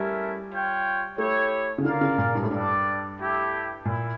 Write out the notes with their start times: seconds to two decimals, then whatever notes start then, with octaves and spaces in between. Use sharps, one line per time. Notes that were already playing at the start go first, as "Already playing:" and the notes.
Already playing: G3 A3 C#4 E4 A#4 E5
0.51 F4 C#5 G5
1.18 A3 E4 G4 C#5
1.78 C#3
1.85 D3 F4 A#4 D5 F5
2.01 C#3
2.18 A#2
2.35 G2
2.43 A2
2.51 G2 G3 D4 A4 D5
3.18 A3 E4 G4
3.85 A#2 E4